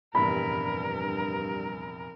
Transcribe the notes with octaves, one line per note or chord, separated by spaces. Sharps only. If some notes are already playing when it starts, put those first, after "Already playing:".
F1 A#1 E2 G2 A#4 B5